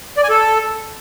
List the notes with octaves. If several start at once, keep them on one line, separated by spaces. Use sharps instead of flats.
D5
G#5
A4